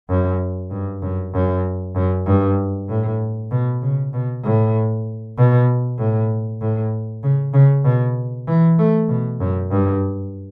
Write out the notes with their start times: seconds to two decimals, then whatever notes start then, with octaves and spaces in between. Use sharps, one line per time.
0.10 F#2
0.71 G2
1.02 F#2
1.34 F#2
1.96 F#2
2.26 G2
2.89 A2
3.51 B2
3.82 C#3
4.13 B2
4.44 A2
5.38 B2
5.98 A2
6.61 A2
7.23 C#3
7.54 C#3
7.85 B2
8.47 E3
8.79 A3
9.09 B2
9.40 F#2
9.71 G2